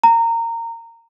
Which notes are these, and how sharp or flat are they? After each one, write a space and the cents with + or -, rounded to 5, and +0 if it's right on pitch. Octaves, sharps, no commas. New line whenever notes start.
A#5 -20